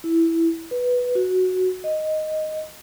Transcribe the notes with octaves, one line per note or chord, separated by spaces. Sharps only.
E4
B4
F#4
D#5